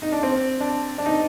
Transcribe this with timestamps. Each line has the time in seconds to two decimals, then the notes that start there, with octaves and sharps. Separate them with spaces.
0.02 D#4
0.12 D4
0.23 C4
0.61 D4
0.98 D4
1.06 D#4